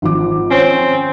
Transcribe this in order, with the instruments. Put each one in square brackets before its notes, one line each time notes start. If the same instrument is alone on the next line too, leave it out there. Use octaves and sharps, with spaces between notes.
[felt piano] G#1 F3 D6
[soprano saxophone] C4 [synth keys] C#4